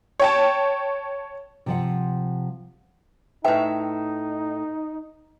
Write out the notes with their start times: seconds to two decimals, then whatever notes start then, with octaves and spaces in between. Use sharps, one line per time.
0.20 C#5 G5 A5
1.66 C3 F3 F#5
3.44 A2 D#4 B4 E5 G5